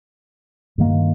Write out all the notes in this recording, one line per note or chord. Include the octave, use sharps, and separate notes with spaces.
G2 D#3 A#3